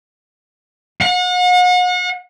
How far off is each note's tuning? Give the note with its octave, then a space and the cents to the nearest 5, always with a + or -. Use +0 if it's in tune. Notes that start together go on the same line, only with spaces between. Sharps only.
F#5 -40